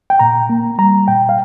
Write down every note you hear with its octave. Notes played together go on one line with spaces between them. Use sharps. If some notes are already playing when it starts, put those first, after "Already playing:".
G5
A#2 A#5
A#3
G3 A#5
A#2 G5
F5